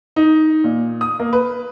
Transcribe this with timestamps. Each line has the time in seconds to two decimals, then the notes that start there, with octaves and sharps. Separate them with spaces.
0.16 D#4
0.64 A#2
1.01 D#6
1.20 A#3
1.33 B4